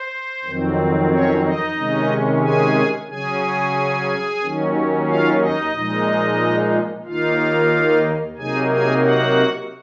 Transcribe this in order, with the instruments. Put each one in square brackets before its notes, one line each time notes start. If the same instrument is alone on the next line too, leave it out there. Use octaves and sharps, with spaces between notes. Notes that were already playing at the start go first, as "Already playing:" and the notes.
Already playing: [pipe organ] C5
F2 D#3 F#3 C4
C#4 C#5
D#4 D#5
C3 D#3 G#3 C#4
G#4 G#5
C#3 F#3 C#4 G#4 G#5
D#2 D#3 F#3 C#4
F4 F5
D#4 D#5
A#2 F3 G#3 D#4
D#2 D#3 A#3 D#4 F4 F5
C3 F#3 A#3 D#4 G#4 G#5
G#4 G#5
F#4 F#5